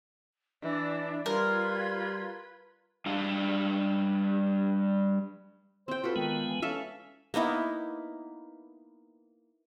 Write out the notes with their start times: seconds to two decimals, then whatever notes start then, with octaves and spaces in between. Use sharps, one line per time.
0.63 E3 D4 D5
1.26 G3 F4 A#4 B4 C6 G#6
3.06 G3 D4 F5
5.88 C4 C5 G5
6.04 F4 F#4 A4 B4
6.16 D#3 G#3 B3
6.48 E3
6.62 C#4 A4 E5 F5
7.34 A#3 B3 D#4 E4